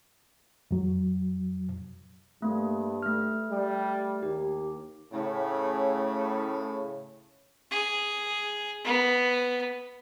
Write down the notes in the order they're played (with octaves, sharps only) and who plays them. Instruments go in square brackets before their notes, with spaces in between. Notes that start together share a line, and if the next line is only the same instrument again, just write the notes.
[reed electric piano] F2 F#3
[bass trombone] G2 [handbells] A3 A#3
[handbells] A3 F6
[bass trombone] G3
[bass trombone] D#2 [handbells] G4
[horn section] A2 C#3
[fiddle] G#4
B3